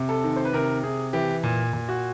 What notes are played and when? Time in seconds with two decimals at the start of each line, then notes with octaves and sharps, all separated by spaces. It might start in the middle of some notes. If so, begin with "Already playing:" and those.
Already playing: C3
0.09 A4
0.24 D#3
0.36 C5
0.45 B4
0.53 C3 A#4
0.83 C3 G#4
1.13 E3 G4
1.44 A#2
1.73 A#2
1.89 F#4